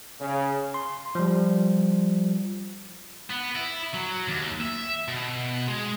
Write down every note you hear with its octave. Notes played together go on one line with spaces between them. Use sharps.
C#3
C6
F3 G3
B3
E4
F#3
D#2
E5
B2
G#3